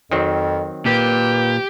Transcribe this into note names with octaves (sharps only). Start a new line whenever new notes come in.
F2 D#3 F#3 C4
A#2 G4 B4